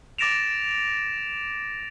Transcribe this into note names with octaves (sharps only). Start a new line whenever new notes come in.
D6 A6 A#6 D7 E7 F7